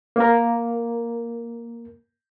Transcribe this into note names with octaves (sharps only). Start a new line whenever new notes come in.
A#3 A#4